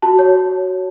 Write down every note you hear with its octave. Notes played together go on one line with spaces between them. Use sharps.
F#4 A5
C#5